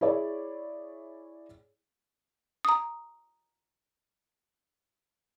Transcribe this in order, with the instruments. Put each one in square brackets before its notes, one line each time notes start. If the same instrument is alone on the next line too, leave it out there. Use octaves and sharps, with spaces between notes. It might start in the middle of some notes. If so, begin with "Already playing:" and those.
[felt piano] E4 G#4 C#5 D5 E5
[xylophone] A#5 D#6